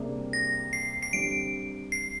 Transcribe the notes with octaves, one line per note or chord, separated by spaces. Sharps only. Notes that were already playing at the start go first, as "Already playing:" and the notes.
Already playing: C3 G3 A#3 D4 G#4
A#6
C7
C7
D3 G3 C4 D7
C7